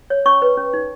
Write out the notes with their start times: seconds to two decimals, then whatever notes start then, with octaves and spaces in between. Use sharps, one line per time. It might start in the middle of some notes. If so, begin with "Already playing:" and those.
0.10 C#5
0.26 C#4 C#6
0.42 B4
0.57 C#4
0.73 D#4